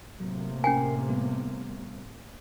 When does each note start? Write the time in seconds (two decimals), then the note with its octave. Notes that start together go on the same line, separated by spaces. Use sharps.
0.20 A2 C3 F#3 A#3
0.64 C#4 A#4 G5 G#5 C7
1.09 G3 B3